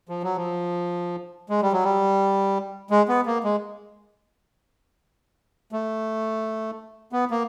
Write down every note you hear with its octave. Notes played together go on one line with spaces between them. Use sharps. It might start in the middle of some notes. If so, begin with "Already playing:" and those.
F3
F#3
F3
G#3
G3
F#3
G3
G#3
B3
A#3
G#3
A3
B3
A#3